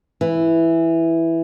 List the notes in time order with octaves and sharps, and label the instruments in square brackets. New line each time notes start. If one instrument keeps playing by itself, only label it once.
[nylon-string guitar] E3